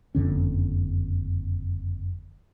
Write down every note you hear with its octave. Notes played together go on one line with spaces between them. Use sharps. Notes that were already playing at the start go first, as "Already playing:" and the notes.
F#1 F2 D3 C#4